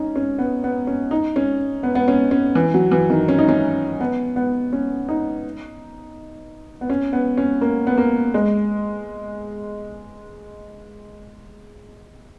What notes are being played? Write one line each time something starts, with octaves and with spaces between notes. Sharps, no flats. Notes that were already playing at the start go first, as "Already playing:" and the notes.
Already playing: C#4 D#4
C#4
B3
B3
C#4
D#4
C#4
B3
B3
C#4
C#4
E3
F#3
E3
D#3
C#4
D#4
C#4
B3
B3
C#4
D#4
B3
C#4
B3
C#4
A#3
B3
A#3
G#3